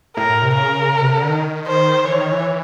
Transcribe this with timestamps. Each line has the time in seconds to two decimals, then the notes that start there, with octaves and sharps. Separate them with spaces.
0.16 A2 A#4
0.29 A2
0.42 C3
0.55 C#3 A#4
0.93 C#3
1.01 C3
1.11 C#3
1.20 D3
1.29 D#3
1.67 C5
2.04 E3 C#5
2.18 D#3
2.32 E3